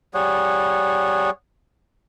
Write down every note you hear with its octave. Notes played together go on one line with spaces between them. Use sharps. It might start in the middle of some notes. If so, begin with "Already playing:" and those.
G3 G#4 C#5 F#5